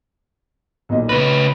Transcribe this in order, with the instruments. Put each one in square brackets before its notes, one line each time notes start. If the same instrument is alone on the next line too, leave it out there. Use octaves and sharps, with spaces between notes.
[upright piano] B1 A#2 D#5
[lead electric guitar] C#3 B4 [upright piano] A#6